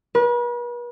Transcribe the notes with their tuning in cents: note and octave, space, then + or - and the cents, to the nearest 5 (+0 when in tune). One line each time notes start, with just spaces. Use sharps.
B4 -40